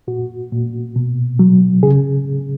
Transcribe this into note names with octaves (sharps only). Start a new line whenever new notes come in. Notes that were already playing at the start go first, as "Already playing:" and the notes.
A#2 F#4
A#2
B2
F#3
C#3 G#4